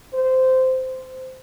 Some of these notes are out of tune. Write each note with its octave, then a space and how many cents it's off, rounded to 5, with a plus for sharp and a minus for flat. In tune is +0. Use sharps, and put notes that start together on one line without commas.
C5 -15
C5 -15